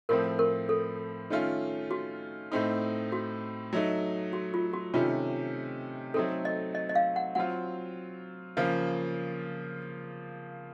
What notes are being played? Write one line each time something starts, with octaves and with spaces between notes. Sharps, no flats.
A2 F3 A3 C4 A#4
A#4
A4
D#3 A3 C#4 F4
F#4
A2 A3 C4 D#4
F#4
F#3 A3 D#4
F#4
F4
F#4
C3 D#3 A3 C#4 F4
F#3 A3 C4 D#4 A4
D#5
D#5
D#5
F5
F#5
F#3 C4 F4 F#5
C#3 F3 A#3 F4